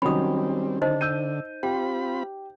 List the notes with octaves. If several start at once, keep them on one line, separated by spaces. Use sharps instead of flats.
D#3 F#3 G3 C4 C#4 B5 D#6
D3 D#4 C5 D#5
E6 G6 D#7
C4 F4 G4 G5 B5